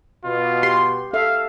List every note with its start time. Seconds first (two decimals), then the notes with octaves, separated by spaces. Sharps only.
0.25 B2 F4
0.63 G4 C6
1.13 A4 E5 F5